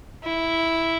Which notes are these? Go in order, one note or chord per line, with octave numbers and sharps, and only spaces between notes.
E4